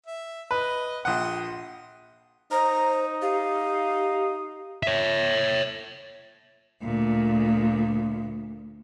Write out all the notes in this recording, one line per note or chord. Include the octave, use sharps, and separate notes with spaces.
E5
B4 D#5
A#1 F#5 G5 C6 D#6
D#4 C5 A#5
G4 F5
C#5 E5
D2 A#2